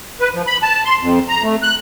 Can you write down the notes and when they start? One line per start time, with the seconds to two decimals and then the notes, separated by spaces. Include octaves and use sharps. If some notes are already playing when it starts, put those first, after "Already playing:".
0.21 B4
0.34 F3
0.47 B5
0.63 A5
0.85 C6
1.01 F2
1.29 A#5
1.43 A3
1.63 F#6